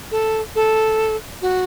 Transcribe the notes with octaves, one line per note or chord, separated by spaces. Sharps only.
A4
A4
F#4